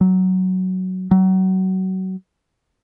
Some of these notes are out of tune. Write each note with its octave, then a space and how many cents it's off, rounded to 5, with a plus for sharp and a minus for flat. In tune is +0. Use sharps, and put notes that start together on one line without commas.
F#3 +10
F#3 +25